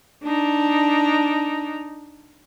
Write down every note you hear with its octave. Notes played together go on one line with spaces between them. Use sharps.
D4 D#4